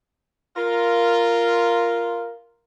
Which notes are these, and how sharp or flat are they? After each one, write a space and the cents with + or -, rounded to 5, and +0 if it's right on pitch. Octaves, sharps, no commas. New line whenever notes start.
F4 -5 A#4 +0